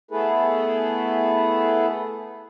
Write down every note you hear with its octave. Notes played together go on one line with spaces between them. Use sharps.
A3 B3 E4 G#4 A4 B4